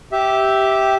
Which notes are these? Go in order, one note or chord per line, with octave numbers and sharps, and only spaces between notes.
G4 E5